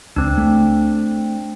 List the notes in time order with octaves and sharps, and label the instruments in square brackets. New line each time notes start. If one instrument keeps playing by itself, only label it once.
[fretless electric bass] C#2 [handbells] C4 D4
[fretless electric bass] A3